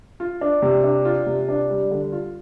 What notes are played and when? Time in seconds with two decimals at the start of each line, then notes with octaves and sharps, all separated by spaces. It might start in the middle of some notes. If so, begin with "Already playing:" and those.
0.20 F4
0.41 D4
0.62 C3
0.84 D4
1.05 F4
1.26 C3
1.49 D4
1.70 G3
1.91 D3
2.12 F4